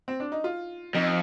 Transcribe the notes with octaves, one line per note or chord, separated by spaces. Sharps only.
C4
D4
D#4
F4
F2 D#4